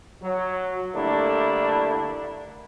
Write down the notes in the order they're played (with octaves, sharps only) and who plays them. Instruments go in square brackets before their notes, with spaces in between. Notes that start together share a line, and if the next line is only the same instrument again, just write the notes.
[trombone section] F#3
D3 G3 A3 A#3 D4 E4